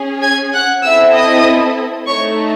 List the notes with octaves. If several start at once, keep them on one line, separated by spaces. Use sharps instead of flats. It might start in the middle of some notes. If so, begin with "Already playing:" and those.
Already playing: C#4 G#4
G#5 G#6
F#5 F#6
C4 E4 A4 E5 E6
D#5 D#6
A3 D#4 A4 C#5 C#6